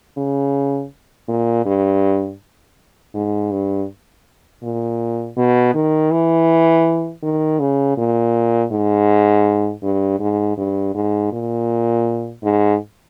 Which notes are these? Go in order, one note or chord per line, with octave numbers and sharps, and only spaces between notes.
C#3
A#2
G2
G#2
G2
A#2
B2
D#3
E3
D#3
C#3
A#2
G#2
G2
G#2
G2
G#2
A#2
G#2